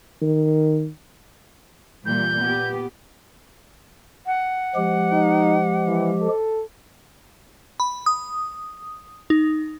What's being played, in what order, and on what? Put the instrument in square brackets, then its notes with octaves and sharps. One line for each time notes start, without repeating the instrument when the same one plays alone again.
[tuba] D#3
[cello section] A#2 E3 G3 [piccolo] G6
[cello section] B3 G4
[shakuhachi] F#5
[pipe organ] F3 G#3 G4
[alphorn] D#4
E3
A4
[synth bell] B5
D#6
D#4